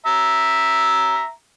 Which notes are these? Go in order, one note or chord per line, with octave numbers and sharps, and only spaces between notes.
E5 A#5